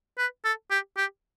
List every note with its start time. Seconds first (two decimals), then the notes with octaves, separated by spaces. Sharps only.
0.18 B4
0.45 A4
0.71 G4
0.97 G4